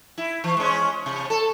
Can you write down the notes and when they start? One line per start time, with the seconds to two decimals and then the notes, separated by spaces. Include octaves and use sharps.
0.18 E4
0.44 E3
0.57 G#3 C#4
1.06 C3
1.30 A4